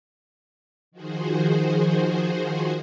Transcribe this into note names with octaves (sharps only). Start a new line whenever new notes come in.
D#3 F3 F#4 G#4 C5